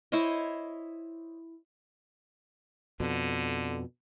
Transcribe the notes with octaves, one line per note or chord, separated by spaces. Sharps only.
E4 C5 C#5 D#5
F2 B2 D3